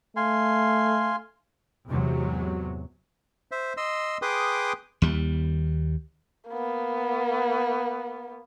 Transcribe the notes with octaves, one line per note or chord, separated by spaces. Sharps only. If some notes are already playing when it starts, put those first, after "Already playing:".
A3 F5 G#5 C6
E2 G#2 C3 F#3
C5 E5
D#5 C6 E6
G#4 B4 G5 C6 D6 D#6
D#2 G3
A#3 B3